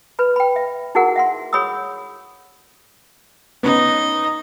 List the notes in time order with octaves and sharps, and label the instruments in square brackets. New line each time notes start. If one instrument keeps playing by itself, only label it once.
[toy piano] B4 B5
G5 B5
E5
D#4 E4 F#4 G#4 A#4 F#5
E5 F#5 C6
G#4 C#5 B5 D#6 E6
[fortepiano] B3 C#4 [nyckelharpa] D#4 D#5